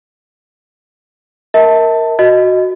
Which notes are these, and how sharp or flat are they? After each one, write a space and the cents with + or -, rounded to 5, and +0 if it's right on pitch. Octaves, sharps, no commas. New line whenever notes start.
A#4 +0 E5 -45 A5 +15
F#4 -5 D#5 +0